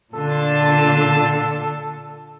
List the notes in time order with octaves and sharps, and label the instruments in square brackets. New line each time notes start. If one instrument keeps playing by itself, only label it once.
[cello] A#2 D3 [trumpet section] D4 F4 A5 [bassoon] A4